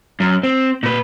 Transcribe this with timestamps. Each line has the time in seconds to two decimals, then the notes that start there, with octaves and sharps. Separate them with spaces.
0.20 F#2
0.43 C4
0.83 A#2 B4